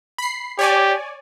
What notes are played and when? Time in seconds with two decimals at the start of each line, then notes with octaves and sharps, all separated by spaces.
0.18 B5 C7
0.59 G4 C#5 D5 G#5